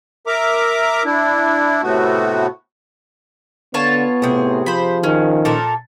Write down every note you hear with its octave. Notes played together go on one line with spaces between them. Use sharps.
A#4 E5 A#5 D6
D4 E4
A2 C3 A3 B3 F#4
D3 B3 F4 C#5 A5
A2 C3 G#4
F3 C5 B5
D#3 C#4
A#2 A4 A#4